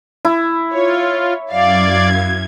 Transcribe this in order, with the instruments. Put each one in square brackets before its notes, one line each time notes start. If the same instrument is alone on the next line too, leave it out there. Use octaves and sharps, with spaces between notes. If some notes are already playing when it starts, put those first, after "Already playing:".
[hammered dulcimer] E4
[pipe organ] F4 [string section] C#5
[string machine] F#2 G#6 [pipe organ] D5 [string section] F5